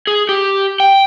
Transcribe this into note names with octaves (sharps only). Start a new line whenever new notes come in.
G#4
G4
G5